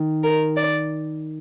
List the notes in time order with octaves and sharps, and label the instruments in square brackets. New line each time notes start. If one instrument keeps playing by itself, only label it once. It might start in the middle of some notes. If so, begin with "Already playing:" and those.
Already playing: [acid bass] D#3
[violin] A#4
D5